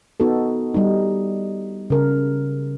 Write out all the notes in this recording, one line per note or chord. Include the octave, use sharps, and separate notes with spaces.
B3 D#4 F#4 A4
G3 D#4
C#3 A#4